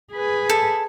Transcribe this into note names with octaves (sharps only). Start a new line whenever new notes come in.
G#4 B4
A4